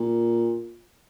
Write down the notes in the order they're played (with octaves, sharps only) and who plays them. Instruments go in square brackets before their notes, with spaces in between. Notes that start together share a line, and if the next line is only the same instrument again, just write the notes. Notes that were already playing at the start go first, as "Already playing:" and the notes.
Already playing: [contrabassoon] A#2